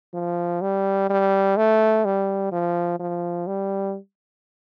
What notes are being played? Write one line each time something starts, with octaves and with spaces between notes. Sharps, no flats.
F3
G3
G3
A3
G3
F3
F3
G3